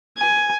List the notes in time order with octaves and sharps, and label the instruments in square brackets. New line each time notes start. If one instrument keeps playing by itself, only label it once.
[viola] G#5